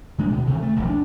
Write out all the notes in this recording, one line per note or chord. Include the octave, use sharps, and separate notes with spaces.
D#3 G#3 D4
D2 B2
C3 D#3 E3
A3
E1 A#1 E2
D4